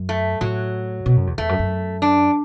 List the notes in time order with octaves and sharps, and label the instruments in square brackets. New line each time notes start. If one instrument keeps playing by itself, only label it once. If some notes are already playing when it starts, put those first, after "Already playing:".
Already playing: [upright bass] F#2
[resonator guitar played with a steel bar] A3
[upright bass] A2 [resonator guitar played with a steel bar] F#3
[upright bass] B2
F#2
E2
[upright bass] E2 [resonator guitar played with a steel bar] A3
[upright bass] F#2
F#2
[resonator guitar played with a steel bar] D4